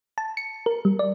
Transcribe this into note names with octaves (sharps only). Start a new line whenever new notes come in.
A5
C#7
A#4
G3
D5